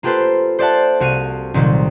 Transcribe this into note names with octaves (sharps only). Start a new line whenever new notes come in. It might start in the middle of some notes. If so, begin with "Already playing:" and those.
A#3 F4 G4 A4 B4 C5
C5 D5 E5 F#5 A5
C2 F#4 F5 D#7
C2 A#2 D#3 F#3 G3